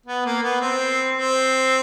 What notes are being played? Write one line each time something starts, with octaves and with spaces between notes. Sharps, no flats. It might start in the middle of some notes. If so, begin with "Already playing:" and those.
B3
A#3
B3
C4
C4